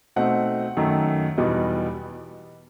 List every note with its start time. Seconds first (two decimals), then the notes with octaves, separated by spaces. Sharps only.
0.16 B2 A3 C4 D#4 F#5
0.77 F#2 D#3 A3
1.37 E2 B2 G3 B3 D#4